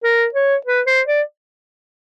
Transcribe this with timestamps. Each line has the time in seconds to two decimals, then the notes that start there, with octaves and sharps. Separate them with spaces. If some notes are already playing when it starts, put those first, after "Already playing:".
0.04 A#4
0.34 C#5
0.66 B4
0.87 C5
1.07 D5